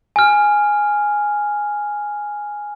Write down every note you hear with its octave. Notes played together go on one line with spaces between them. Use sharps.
G#5 F6